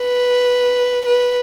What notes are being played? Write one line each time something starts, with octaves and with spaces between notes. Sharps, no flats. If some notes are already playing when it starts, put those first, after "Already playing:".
Already playing: B4
B4